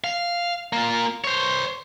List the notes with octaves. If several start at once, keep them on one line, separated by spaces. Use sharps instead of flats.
F5
A#3 F4
C5 C#5